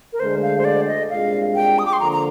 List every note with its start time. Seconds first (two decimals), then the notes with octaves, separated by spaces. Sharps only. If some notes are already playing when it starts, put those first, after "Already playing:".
0.13 A#4
0.19 D2 D3 G#3 C5
0.42 F5
0.58 C5
0.65 D5
0.87 D#5
1.10 C2 A#2 G#3 D4 F5
1.55 G5
1.79 D#6
1.86 D6
1.93 C6
2.00 D3 F3 A#3 A#5
2.12 A#5